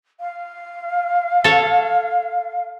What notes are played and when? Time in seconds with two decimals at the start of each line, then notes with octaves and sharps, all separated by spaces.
0.20 F5
1.44 A4 C#5